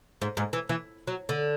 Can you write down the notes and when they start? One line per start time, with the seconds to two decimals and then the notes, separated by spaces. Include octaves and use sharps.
0.22 G#2
0.37 G#2
0.53 E3
0.69 E3
1.07 F#3
1.29 D3